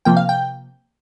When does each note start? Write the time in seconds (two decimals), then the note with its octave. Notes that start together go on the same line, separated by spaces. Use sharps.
0.05 C3 F3 A#3 G5
0.17 F5
0.29 G5